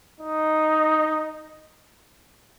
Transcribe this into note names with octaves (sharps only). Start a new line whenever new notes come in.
D#4